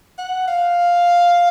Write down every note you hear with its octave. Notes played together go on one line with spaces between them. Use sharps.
F#5
F5